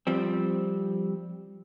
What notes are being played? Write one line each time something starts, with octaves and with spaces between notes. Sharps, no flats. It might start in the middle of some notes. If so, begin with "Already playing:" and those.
F3 G3 C4